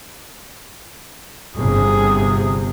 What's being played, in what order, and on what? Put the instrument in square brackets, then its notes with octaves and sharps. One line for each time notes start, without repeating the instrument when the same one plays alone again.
[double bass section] G1 C3 [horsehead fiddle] G#4